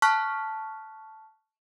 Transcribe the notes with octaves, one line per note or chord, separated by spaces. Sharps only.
A5 C#6 F6 F#6 B6